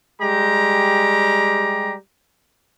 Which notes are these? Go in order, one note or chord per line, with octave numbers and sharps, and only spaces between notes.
G3 G#3 G4 A#5